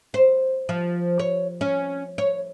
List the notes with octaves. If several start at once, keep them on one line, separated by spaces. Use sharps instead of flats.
C5
F3
C#5
C#4
C#5